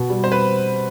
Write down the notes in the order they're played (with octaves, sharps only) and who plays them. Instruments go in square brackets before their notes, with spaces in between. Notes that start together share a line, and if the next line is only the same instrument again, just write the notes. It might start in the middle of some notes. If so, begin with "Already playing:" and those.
Already playing: [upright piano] B2
G3
[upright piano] C4 [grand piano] C5
[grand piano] B4